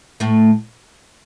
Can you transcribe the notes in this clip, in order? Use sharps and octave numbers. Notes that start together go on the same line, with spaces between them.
A2 A3